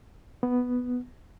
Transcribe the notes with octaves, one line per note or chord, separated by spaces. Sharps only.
B3